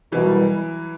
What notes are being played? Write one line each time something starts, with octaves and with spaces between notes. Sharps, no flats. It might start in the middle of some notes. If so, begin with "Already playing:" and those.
C2 B2 E3 F#3 G3